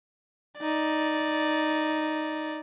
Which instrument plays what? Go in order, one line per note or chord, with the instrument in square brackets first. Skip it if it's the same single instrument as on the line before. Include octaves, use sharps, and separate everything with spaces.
[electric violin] D#4 D5